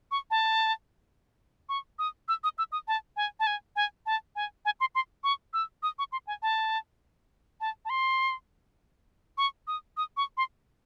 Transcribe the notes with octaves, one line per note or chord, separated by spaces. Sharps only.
C#6
A5
C#6
D#6
E6
D#6
E6
D#6
A5
G#5
A5
G#5
G#5
A5
G#5
G#5
C6
C6
C#6
E6
D#6
C#6
C6
G#5
A5
A5
A5
C6
C#6
D#6
D#6
C#6
C6